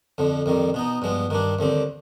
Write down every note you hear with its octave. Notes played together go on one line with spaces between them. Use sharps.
F2 D3 F3
F2 D#3 G3
B2 B3 D#4
G2 F3 G#3 B3
G2 D#3 G3 D4
D#2 D3 G3 C4